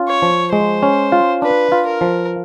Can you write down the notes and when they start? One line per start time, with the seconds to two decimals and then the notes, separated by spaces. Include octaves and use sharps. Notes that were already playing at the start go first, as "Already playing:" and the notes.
Already playing: C#4 F4
0.08 C#5
0.22 F3
0.52 G#3 C5
0.83 C#4
1.12 F4
1.42 D4 B4
1.72 F4
1.87 A#4
2.01 F3